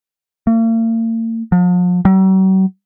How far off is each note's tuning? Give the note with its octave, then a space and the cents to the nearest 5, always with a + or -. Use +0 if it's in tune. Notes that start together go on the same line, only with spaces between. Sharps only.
A#3 -45
F3 +40
F#3 +45